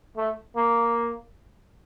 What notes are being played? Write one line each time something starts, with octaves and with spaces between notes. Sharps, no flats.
A3
A#3